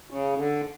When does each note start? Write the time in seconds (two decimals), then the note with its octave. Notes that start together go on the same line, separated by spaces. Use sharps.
0.10 C#3
0.37 D3